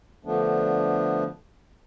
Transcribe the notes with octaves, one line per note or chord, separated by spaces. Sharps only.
D3 F3 A3 B3 D4